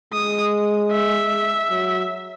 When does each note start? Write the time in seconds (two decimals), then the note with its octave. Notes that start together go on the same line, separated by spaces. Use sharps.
0.13 G#3 D#6
0.92 E5
1.71 F#3